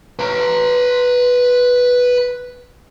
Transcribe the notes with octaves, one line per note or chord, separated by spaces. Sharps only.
B4 A#5